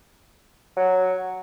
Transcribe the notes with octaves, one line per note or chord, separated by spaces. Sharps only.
F#3